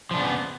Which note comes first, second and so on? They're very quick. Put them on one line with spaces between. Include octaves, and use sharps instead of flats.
F3 D4 C#3 B3